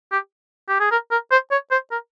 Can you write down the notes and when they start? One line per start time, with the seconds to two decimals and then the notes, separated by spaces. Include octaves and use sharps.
0.12 G4
0.69 G4
0.80 G#4
0.91 A#4
1.11 A#4
1.31 C5
1.51 C#5
1.71 C5
1.91 A#4